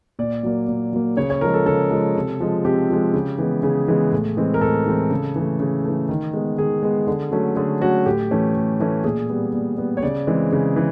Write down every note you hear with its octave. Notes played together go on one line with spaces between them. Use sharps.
A#2 D5
F#3 A#3
A#2
F#3 A#3
C#3 C#5
C#5
F3 G#3 A#4
A4
C#3 A4
F3 G#3
C3
F3 G#3
C3 G4
F3 G#3
C#3
E3 G#3 B3
C#3 G#4
E3 G#3 B3
A2
E3 G#3 C4
A#4
A2 A4
E3 G#3 C4
C#3
E3 A3
C#3
E3 A3
D#3
G#3 B3
D#3 G#4
G#3 B3
D3
F#3 A3 C#4
D3 G#4
F#3 A3 C#4 F#4
A2 G4
E3 A3 C#4
A2
E3 A3 C#4
A#2 G#4
G3 B3
A#2
G3 B3
C#5
C#3 D5
E3 G#3 C4
C#3
E3